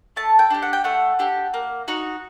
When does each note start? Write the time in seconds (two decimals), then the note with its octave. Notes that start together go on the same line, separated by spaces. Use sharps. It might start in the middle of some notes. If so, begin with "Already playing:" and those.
0.16 A3 A5
0.39 G5
0.50 D4 G4
0.62 F#5
0.73 G5
0.84 A3 F#5
1.19 D4 G4
1.54 A#3
1.88 D#4 F#4